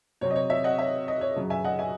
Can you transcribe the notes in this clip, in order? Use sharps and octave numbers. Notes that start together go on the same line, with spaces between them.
C3 F#3 C4 C#5
D#5
C#5
C#5 E5
D#5 F#5
C#5 E5
D#5
C#5
F#2 C#3 F#3
E5 G#5
D#5 F#5
E5 G#5